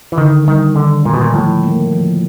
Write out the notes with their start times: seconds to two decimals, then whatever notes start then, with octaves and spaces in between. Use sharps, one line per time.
0.12 E3
0.18 D3 D#3
0.47 D#3 G3
0.76 D3 D#3
1.05 A#2 G#3
1.14 B2
1.21 A#2
1.34 A2 F3
1.63 A#3
1.92 F3